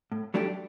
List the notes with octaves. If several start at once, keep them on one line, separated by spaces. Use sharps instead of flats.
A2
F#3 A3 D4 G4